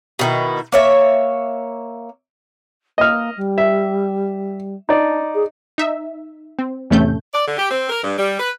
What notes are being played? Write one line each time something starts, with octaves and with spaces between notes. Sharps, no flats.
B2 D#3 E4
A#3 C#5 E5
A#3 D#5 F6
G3
E5
D4 D#4 D5
G#4
D#4 E5
C4
A1 E2 C3 A3 C#4 G6
D5
D3
G4
C4
A#4
G2
G3
B4